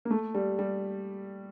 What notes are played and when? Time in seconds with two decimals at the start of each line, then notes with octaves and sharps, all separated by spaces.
0.05 A#3
0.11 A3
0.35 G3
0.59 G3